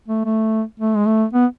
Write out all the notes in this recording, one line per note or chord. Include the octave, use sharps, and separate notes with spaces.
A3
A3
A3
G#3
A3
B3